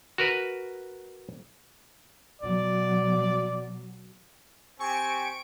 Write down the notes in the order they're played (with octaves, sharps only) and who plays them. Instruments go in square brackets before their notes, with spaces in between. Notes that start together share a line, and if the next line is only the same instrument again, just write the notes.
[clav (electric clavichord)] F#4 A#4 B4
[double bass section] B2 F#3 [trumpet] D5
[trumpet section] C4 G4 G#5 [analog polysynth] C#6 D7